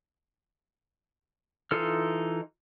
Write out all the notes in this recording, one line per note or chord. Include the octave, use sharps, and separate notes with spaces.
E3 D#4 F4 A4 F6